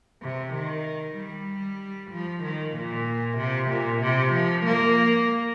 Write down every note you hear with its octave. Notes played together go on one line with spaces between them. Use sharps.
C3
D#3
G3
F3
D#3
A#2
C3
A#2
C3
F3
A#3